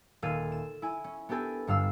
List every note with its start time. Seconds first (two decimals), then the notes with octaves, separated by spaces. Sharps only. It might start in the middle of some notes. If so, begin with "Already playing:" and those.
0.22 D#1 A4 F5 G#6 D#7
0.52 E7
0.82 E4 G#5
1.04 C#4
1.29 B3 D4 G4 A4 G#5
1.67 G1 G2 F5 E6